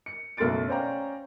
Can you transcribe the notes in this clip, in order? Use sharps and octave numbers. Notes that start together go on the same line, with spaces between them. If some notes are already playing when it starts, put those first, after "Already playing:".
C#7
F#1 B1 A3 C6 A6 D7
C#4 C5 D5 F5 G5 A#5